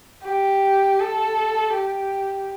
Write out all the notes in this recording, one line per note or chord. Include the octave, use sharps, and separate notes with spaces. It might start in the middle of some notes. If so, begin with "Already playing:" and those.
G4
A4
G4